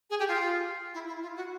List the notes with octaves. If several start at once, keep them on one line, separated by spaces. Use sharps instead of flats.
G#4
G4
F4
E4
E4
F4
F#4